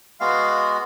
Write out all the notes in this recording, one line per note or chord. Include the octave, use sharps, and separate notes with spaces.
G#3 B3 F#4 F5